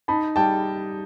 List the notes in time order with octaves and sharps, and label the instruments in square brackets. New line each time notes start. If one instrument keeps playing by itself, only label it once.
[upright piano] D#4 [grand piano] A5 B5
[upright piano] G3 [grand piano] G5 A5